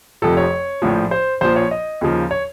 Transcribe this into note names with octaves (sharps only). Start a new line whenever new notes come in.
F1 F2 C3 F3 A4
C#5
A#1 A2 F3
C5
A#1 A#2 F3 C5
C#5
D#5
D#2 C#3 F3
C#5